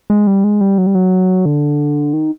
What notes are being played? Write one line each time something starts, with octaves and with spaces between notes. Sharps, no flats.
G#3
G3
G#3
G3
F#3
G3
F#3
D3
D#3